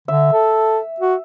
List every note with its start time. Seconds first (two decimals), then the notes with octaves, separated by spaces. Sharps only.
0.08 D3 E5
0.33 A4
1.00 F#4